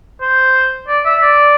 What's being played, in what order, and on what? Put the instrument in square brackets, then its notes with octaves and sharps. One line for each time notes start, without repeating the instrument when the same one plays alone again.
[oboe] C5
D5
E5
D5